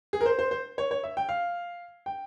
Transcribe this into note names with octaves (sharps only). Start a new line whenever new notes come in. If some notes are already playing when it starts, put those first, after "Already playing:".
G#4
A#4
C5
C5
C5
C#5
C#5
E5
G5
F5
G5